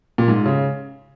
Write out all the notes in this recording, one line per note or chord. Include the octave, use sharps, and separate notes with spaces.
A#2
G#2
C#3